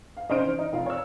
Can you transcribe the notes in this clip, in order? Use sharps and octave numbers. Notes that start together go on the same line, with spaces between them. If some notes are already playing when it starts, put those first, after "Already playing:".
F5
F1 C#4 D#4 C5 F6 D7
E3
D#4
F1 F4 F5
C#5 E6